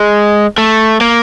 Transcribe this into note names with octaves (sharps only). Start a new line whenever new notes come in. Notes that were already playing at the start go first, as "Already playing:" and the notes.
Already playing: G#3
A3
A#3